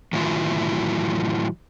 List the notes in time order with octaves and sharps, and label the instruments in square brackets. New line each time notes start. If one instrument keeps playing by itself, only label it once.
[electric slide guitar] A2 D#3 E3 F#3 E4 F4